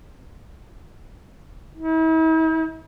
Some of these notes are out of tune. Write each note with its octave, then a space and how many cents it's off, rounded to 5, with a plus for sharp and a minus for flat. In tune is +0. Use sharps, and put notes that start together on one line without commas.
E4 -45